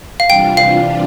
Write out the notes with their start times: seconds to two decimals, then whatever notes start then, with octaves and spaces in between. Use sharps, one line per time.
0.20 F5
0.29 C3 E3 G3 D4 F4 G5
0.57 F5